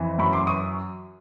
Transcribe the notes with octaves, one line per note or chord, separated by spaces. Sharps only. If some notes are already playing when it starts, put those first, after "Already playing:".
Already playing: F2 E3
F#2 B5 C#6
C6 D6
C#6 D#6